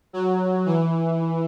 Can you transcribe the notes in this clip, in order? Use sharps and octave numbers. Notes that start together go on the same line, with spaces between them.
F#3
E3